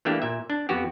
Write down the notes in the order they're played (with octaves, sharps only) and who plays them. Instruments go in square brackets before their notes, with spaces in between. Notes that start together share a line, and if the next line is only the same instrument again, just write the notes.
[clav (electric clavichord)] E3 A3 A#3 D4 G4
A#2 E5
D4
F2 B3 F#4 G4